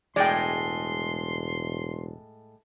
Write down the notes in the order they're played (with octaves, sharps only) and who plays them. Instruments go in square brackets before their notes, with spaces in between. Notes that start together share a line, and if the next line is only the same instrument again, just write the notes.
[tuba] E1 [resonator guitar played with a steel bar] A2 G#3 [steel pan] D5 G5 [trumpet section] C6